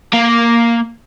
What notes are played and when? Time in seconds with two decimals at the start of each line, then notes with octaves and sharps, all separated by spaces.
0.13 A#3 F5